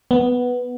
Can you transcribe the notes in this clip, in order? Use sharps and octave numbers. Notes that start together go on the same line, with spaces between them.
B3